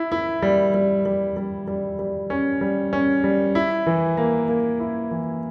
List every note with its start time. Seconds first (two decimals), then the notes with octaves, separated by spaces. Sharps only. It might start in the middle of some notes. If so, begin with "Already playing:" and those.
Already playing: E4
0.12 E4
0.42 G3
0.74 G3
1.06 G3
1.37 G3
1.67 G3
1.99 G3
2.30 C#4
2.61 G3
2.93 C#4
3.24 G3
3.55 E4
3.87 E3
4.17 A#3
4.48 A#3
4.80 E4
5.11 E3